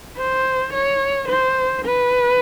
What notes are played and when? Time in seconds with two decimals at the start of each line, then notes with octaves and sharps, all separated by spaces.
0.18 C5
0.73 C#5
1.29 C5
1.85 B4